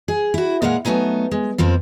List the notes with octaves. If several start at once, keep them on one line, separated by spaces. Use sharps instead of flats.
G#4
E4 F#4
A#2 G#3 A#4 F5 F#5
F#3 A3 B3 D#4 G#5
G#3
F2 F3 A#3 C4